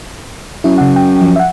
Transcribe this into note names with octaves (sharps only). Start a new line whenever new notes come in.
F#2 E4
C#3 F#5
G5
F3
E5 F#5